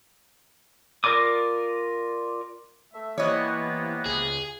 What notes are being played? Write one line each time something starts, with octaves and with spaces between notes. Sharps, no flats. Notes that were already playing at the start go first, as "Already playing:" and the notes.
F4 A#4 D5 D6 D#6
A3 E5
C3 E3 A#3 B3 C#5 D#5
C#2 G#4